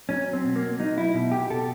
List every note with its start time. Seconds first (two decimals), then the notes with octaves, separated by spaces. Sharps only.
0.09 F#3 C#4
0.33 C4
0.44 B2
0.56 A#3
0.79 F#3 D#4
0.98 E4
1.14 B2
1.31 G4
1.50 B2 A4